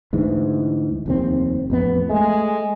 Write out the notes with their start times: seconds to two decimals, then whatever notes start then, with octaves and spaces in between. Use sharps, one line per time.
0.13 D2 G#2 E3
1.06 F1 D#2 C4
1.70 A1 F2 B3
2.10 G#3 A3